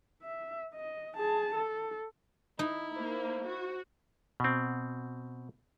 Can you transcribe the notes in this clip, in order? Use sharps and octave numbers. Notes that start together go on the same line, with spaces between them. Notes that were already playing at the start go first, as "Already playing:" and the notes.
E5
D#5
G#4 A5
A4
D#4 E4
A#3 C5
F#4
B2 C4